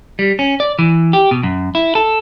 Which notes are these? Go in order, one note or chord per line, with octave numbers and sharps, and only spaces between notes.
G3
C#4
D5
E3
G4
B2
F#2
E4
A4